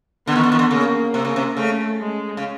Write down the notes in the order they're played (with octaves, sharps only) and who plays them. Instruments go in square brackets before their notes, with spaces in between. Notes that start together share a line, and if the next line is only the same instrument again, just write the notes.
[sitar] D3 [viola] B3
[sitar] D#3
D3
D#3
D3
[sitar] C#3 [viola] A#3
[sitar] C3
C#3
C3
[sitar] C#3 [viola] A3
[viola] G#3
[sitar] C#3